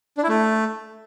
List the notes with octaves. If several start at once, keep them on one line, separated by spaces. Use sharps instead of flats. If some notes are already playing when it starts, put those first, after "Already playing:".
D4
E4
A3